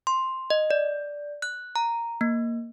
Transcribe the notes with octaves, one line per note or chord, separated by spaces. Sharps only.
C6
D#5
D5
F#6
A#5
A#3